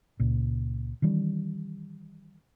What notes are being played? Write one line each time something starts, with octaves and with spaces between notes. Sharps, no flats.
C#2 A#2
D#3 E3 G3 C#4